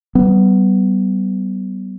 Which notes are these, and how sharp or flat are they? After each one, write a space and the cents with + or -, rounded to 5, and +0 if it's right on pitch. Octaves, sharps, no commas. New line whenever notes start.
G3 -35 B3 +10